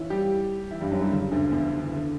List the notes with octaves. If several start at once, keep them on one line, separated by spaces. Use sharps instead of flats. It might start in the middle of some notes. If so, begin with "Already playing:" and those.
Already playing: E3 C#4 E4
G3 G4
E3 E4
G2 G3
F#2 F#3
G2 G3
C#3
D2 D3
E2 E3
D3
E3
D3